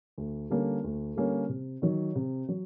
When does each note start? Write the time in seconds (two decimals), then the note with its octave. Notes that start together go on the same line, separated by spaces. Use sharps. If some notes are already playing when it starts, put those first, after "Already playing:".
0.18 D2
0.50 D3 G3 A#3 C#4
0.84 D2
1.16 D3 G3 A#3 C#4
1.49 C3
1.82 D#3 F#3
2.15 C3
2.49 F#3